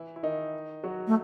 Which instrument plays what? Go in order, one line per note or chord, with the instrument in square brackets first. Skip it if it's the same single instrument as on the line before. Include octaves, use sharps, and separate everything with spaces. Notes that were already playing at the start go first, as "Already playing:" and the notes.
Already playing: [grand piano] E3 E4
E4
D#3 D#4
F#3 F#4
[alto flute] A3